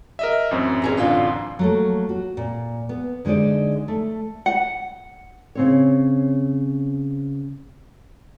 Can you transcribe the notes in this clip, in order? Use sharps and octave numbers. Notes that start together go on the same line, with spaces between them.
A#4 D#5 E5
A1 F#2 C4
C#4 G#4 A#5
A2 D3 F4
F#3 A3 A#3
F#4
A#2
B3
D3 G#3 D#4 C5 D5
A3
F#5
C#3 C4 C#5